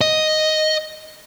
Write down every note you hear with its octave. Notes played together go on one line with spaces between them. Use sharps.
D#5